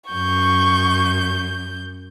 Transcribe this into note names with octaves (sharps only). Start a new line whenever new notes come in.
F#2 C#6 G6